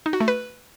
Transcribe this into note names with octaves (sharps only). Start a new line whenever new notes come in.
D#4
F#4
A3
B4